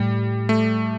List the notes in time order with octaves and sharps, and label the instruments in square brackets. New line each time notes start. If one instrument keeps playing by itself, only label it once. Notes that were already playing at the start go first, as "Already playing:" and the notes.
Already playing: [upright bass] A2 [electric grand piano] G3
[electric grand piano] A3